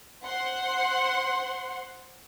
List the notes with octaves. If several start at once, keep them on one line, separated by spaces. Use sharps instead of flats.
C5 F#5 C6